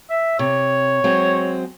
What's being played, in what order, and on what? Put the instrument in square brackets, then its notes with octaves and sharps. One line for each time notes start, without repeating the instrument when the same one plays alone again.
[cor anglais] E5
[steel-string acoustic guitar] C3 [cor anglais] C#5
[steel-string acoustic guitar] F#3 G#3 C4